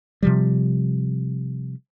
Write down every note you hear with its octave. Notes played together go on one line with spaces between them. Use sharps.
C3 F3 G3